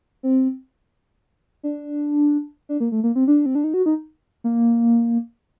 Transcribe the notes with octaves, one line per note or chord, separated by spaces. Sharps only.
C4
D4
D4
A#3
A3
A#3
C4
D4
C4
D4
D#4
F#4
D#4
A#3